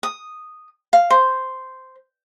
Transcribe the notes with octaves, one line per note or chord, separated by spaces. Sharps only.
D#6
F5
C5